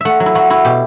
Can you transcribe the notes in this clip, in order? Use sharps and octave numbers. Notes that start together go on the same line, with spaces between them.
A3 E5 F#5
F#3
E4
F#3 F#4
E4 F#4
B2 G4